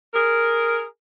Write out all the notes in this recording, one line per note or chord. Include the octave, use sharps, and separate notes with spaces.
G#4 A#4